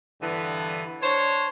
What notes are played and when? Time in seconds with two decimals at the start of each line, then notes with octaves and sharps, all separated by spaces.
0.21 G2 D3 E3 B3
1.02 D4 C5 C#5